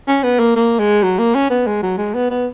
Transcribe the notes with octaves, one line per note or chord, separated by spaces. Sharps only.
C#4
B3
A#3
A#3
G#3
F#3
A#3
C#4
B3
G#3
F#3
G#3
B3
B3